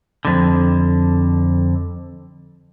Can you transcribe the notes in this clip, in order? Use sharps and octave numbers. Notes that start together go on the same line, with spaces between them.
F2 D3